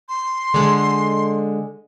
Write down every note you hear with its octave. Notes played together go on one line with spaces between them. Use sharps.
C6
D3 G#3